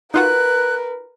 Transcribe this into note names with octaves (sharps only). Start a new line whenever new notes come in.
D#4 F4 F#4 A#4 B4 F#6